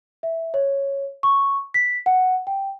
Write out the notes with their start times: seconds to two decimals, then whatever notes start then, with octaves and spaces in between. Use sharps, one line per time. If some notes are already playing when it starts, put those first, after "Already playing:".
0.23 E5
0.54 C#5
1.23 C#6
1.74 B6
2.06 F#5
2.47 G5